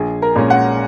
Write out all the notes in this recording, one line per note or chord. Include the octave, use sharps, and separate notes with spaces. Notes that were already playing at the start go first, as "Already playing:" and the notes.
Already playing: A#1 G#4
A#4
A#2 G#3 C#4
F#5